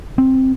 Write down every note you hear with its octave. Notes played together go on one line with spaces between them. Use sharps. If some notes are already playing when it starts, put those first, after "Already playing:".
C4